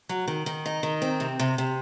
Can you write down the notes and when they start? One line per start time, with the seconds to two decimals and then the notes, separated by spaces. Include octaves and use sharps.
0.09 F#3
0.28 D#3
0.46 D#3
0.66 D#4
0.83 D#3
1.02 C4
1.20 C3
1.40 C3
1.58 C3